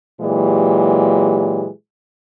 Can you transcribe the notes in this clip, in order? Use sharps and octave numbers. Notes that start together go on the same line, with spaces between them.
A#2 E3 F#3 G#3 G4